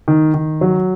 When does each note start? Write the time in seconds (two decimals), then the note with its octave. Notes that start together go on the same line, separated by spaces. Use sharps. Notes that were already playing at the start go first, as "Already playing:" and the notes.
0.08 D#3
0.34 D#3
0.61 F#3